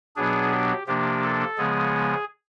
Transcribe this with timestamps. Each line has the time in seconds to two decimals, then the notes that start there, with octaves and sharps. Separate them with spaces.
0.16 B2 F#3 B3 D4 G#4
0.52 G4
0.87 C3 F3 A#3 D4 G4
1.23 A4
1.58 C#3 F3 G#3 B3 G#4